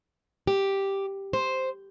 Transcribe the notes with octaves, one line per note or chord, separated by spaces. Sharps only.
G4
C5